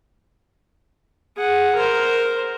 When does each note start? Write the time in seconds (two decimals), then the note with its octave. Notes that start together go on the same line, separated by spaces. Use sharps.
1.37 G#4 F#5
1.75 A#4 C5